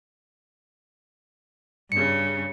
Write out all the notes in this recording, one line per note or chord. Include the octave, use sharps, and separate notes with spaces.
G2 C#3 C#7